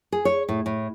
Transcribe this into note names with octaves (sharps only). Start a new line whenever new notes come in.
G#4
C#5
A2
A2